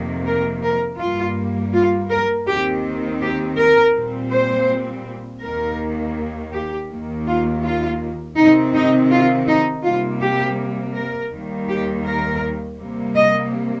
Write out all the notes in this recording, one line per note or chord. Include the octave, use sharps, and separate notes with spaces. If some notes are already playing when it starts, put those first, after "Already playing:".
Already playing: F2 C3 D#3 A#3
A#4
A#4
G2 G3 A#3 F4
F4
A#4
D#2 D#3 C4 G4
G4
A#4
A#2 G3 C4
C5
D#2 D#3 A#3 A#4
G4
D#2 D#3 A#3
F4
F4
C3 D#3 C4 D#4
D#4
F4
D#4
C3 G3 A#3 F4
G4
A#4
D#2 D#3 G3 A#3
G4
A#4
C3 G3 A#3
D#5